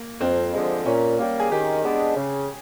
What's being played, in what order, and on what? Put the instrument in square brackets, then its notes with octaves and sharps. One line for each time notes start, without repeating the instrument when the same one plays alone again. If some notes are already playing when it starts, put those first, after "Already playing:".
Already playing: [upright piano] A#3
[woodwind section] F2 [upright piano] C4
[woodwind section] D3 F3 G#3
[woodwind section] A#2 [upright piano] C#4
[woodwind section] G3 A#3
[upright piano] G#4
[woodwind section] D#3 [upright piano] G4
[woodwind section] G#3 B3 D4
C#3